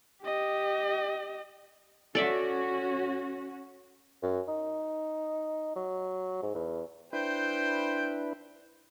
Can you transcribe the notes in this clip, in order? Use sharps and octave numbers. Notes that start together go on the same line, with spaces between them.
G4 D#5
C#4 F#4 A4 D5 E5
F#2
D#4
F#3
G#2
E2
D4 E4 B4 C5 G5